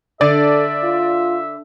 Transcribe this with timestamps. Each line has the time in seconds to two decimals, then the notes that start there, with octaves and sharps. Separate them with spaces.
0.21 D3 A4 D5 E5
0.84 F4